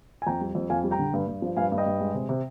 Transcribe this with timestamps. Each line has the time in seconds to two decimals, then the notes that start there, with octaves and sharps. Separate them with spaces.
0.22 G#5
0.27 F2 G5 A#5
0.41 G3
0.55 F2
0.70 F2 F5 G#5
0.84 G3
0.91 G5 A#5
0.99 D3
1.13 G2
1.27 G2
1.42 F3
1.57 G2 F5 G#5
1.72 G2
1.78 D#5 G5
1.86 G2
2.00 G#3
2.14 C3
2.29 C3